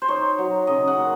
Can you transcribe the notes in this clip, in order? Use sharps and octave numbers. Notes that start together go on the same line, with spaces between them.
C5
D#4 C#5
F#3
C#3 D#5
F#5
A#3